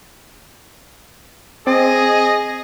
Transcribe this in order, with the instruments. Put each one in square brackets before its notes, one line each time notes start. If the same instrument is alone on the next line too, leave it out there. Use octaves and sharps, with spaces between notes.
[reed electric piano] C4 [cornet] G#4 [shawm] D#5